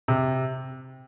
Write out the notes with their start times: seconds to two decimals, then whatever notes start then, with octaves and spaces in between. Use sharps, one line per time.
0.08 C3